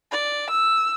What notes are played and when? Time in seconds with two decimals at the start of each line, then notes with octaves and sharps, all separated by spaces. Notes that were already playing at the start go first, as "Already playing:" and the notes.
0.12 D5
0.51 E6